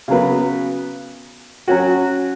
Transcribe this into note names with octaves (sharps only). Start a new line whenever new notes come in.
C#3 F#3 B3
F#3 C#4 F#4